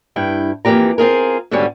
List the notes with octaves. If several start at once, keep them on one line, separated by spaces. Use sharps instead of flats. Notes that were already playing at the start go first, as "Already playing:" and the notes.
G2 E4 G5
F2 E3 A#3 D4 G4 A#5
C4 F4 G#4 A#4
G#2 B2 D3 D#3 G3 C#4